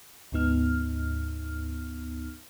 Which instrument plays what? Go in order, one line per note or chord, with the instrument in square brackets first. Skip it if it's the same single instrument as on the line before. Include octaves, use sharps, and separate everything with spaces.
[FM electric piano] D2 G#2 B3 D#4 F6